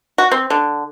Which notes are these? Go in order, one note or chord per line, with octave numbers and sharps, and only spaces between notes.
F#4
C4
D3